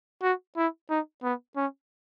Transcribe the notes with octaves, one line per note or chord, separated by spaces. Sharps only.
F#4
E4
D#4
B3
C#4